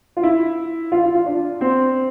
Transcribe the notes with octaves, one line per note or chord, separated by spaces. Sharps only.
F4
E4
F4
F4
F4
D4
C4